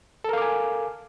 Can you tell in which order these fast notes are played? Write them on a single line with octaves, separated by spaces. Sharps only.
A4 A#4 F5 D6 G#5